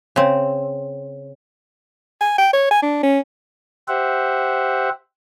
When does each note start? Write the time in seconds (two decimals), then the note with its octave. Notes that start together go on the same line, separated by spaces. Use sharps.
0.16 C#3 C4
2.21 G#5
2.38 G5
2.53 C#5
2.71 G#5
2.82 D4
3.03 C#4
3.88 G4 C5 E5 F#5